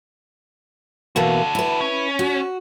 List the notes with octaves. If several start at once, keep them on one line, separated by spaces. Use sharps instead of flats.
B2 E3 A#3 F#4 A4
E4 B4
C#4
F#4